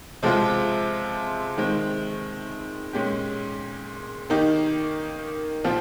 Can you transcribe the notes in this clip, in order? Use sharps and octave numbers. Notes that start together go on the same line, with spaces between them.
C3 F3 G#3 C4 F4
D#3 G#3 C4
A#2 G#3 C#4 G4
D#3 A#3 D#4 G4
A#2 F3 C4 F4